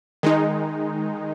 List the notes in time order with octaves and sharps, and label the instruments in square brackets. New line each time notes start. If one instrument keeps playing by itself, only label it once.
[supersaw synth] D#3 G#3 D#4